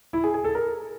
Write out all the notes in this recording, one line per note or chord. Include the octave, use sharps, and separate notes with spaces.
E4
G#4
G#4
A4
A#4